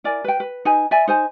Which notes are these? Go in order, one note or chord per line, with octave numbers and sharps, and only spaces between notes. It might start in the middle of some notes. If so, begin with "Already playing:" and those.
E4 A#4 D5 G#5
B4 G5
B4
D#4 B4 G#5
D5 E5 G#5
D#4 C5 G#5